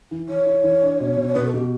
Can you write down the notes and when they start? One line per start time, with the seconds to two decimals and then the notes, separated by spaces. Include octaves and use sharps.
0.11 E3
0.29 E3 C#5
0.46 E4
0.64 E3
0.83 D4
1.00 B2
1.17 B2
1.35 B2 B4
1.45 A4
1.54 B2 G4